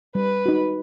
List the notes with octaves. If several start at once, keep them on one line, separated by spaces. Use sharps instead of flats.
G3 B4
D#4 F#4